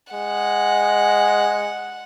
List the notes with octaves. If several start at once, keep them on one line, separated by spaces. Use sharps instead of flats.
G#3 F#5